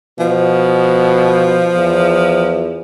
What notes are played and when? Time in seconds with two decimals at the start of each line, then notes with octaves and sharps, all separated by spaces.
0.19 B2 F3
1.75 E2